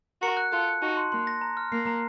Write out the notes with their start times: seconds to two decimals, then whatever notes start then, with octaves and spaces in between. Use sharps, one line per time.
0.22 F#4 A#4 C#7
0.37 F#6
0.52 F4 A4 F#6
0.68 C#7
0.82 D#4 F#4 A5
0.97 C6
1.12 A#3 C6
1.27 A#6
1.41 A#5
1.57 F6
1.72 A#3 C7
1.87 A#5